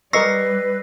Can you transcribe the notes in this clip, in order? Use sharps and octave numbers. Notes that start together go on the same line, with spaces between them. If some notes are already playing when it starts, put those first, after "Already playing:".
G3 A#4 B4 D#5 C#6 E6 A#6 C7